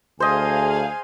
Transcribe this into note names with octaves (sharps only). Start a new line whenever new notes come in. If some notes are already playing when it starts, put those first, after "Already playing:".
D2 G#4 C5 D#5 F5 G#5